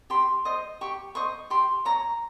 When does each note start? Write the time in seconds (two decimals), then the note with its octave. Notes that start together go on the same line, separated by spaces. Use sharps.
0.10 G4 C6
0.45 C5 D#5
0.81 G4 C#6
1.15 C5 D#5 C#6
1.50 G4 C6
1.85 C#5 A#5